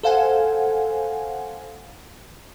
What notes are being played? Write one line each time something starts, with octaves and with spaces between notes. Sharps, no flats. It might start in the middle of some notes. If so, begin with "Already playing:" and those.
A4 C5 F5 F#5 G#5